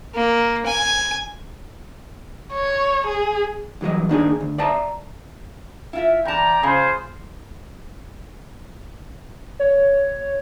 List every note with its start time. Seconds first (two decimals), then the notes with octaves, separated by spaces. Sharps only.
0.14 A#3
0.66 G#5
2.53 C#5
3.07 G#4
3.81 C2 E3 F#3 D#5
4.09 D#2 D4 D#4 G#4
4.41 D2
4.58 D5 E5 A5 A#5
5.93 E4 F4 E5
6.25 E2 D5 G5 A5 A#5
6.63 C#3 F4 G#4 C5
9.59 C#5